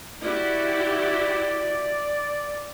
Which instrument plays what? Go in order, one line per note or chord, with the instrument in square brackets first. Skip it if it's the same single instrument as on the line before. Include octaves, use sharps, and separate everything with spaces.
[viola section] E4 F#4 G4 [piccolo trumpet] D5